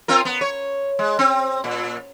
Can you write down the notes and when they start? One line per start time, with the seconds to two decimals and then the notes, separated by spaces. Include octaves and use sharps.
0.08 C4 F4 A#4
0.25 B3
0.41 C#5
0.99 G#3
1.19 C4
1.64 A#2